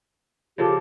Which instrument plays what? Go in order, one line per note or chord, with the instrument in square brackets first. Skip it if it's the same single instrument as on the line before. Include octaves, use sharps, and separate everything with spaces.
[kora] C#3 F3 A4 [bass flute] G4